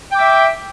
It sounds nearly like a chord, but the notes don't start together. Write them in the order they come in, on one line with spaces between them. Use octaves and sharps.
G5 D6 E5